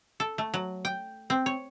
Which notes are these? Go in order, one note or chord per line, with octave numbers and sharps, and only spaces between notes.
A4
A3
F#3
G5
C4
C#5